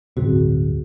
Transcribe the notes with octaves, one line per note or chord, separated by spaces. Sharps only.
D1 G1 C3 F#4 G#4